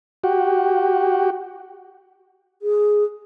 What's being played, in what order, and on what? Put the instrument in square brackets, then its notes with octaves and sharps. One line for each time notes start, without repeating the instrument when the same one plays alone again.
[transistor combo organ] F#4 G4
[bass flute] G#4